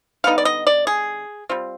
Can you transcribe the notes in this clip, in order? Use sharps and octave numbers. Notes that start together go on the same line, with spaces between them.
D3 G3 B3 D#4 F5
D5
D#5
D5
G#4
G3 C4 F4